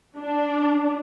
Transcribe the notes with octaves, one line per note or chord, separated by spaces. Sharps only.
D4